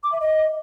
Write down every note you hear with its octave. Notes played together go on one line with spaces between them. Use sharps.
D6
E5
D#5